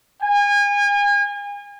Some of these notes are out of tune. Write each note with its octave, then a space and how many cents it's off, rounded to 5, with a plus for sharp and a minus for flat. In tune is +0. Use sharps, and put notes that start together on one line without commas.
G#5 -35